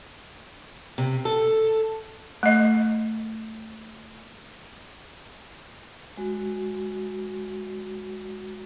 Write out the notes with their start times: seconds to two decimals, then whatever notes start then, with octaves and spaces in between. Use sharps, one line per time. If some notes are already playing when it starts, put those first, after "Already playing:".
0.98 C3
1.25 A4
2.43 A3 D#5
6.17 G#3 F#4